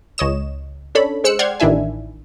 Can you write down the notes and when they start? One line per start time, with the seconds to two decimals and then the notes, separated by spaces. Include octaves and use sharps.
0.18 C#2 C#5 D#5 E7
0.95 C#4 D4 A4 C#5 B5
1.24 G#3 C5 E6 F#6 C#7
1.39 D5 F#5 G5 C6 F6 G#6
1.60 A1 D#3 D4 E4 E5 G#5